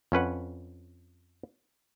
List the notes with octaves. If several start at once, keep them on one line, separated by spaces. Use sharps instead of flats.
F2 C#4 B4 F#5